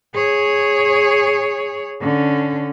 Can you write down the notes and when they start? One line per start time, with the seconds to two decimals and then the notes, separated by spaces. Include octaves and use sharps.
0.14 G#4 C#5
2.01 D3 C#4